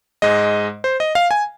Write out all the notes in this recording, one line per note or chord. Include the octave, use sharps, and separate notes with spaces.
G#2 G#3 D#5
C5
D#5
F5
G#5